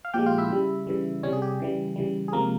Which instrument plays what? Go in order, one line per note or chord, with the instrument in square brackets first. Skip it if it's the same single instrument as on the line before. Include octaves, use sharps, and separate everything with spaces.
[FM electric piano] F5
A#2 F3 G#3 G4 G5
F4 F5
E4 E5
C#3 G3
C#3 E3 G3
C3 G3 C#4 C#5
G#4
G4
C#3 E3 G3
C#3 E3 G3
G#4
C3 F3 G#3 A#3 A#4